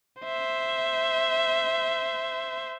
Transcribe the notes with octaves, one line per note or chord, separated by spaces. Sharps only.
C5 E5